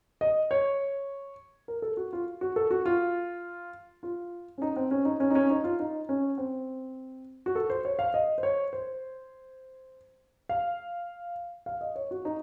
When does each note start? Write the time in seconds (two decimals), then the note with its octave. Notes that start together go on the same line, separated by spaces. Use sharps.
0.21 D#5
0.51 C#5
1.68 A#4
1.82 A4
1.97 F#4
2.13 F4
2.41 F#4
2.56 A4
2.71 F#4
2.86 F4
4.03 F4
4.58 C#4
4.62 D#4
4.76 C4
4.91 C#4
5.05 D#4
5.20 C#4
5.30 D#4
5.35 C#4
5.50 D#4
5.64 F4
5.79 D#4
6.09 C#4
6.38 C4
7.46 F#4
7.55 A4
7.70 C5
7.85 C#5
7.99 F5
8.14 D#5
8.38 C5
8.43 C#5
8.73 C5
10.49 F5
11.66 F5
11.81 D#5
11.96 C#5
12.11 F#4
12.25 D#4